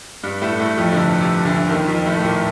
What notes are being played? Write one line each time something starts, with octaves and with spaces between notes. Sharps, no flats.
G2 G3
A2 A3
A2 A3
F2 F3
D3
C3
C3
D2 D3
D#2 D#3
F2 F3
A2 A3
A3
A#2 A#3